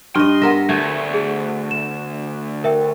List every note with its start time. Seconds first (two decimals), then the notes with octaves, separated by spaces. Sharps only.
0.16 G2 D#5 C6 F6
0.42 B3 A#4 E5 A#6
0.69 D2 A3
1.14 G#4
1.71 E7
2.64 A#4 E5 G5